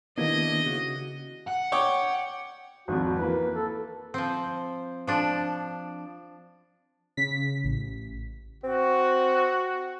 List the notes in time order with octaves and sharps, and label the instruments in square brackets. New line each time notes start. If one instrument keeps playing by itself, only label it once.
[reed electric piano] D#3 A#3 B3 [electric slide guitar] D4 E4 G4 [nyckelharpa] D#5
[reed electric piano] C#3 [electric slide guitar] F#4
[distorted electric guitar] F#5
[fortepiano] C#5 G5 D6
[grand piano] G#1 F2 [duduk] F#4
[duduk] F#4
[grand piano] E3 A#3 [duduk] B4
[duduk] A4
[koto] F3 C4
F3 D4
[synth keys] C#3 B6
A1
[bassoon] C4 [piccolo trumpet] F#4